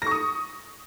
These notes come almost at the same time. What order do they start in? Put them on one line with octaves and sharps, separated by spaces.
A#6 C#6 D#6